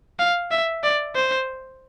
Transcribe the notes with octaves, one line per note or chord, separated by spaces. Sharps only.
F5
E5
D5
C5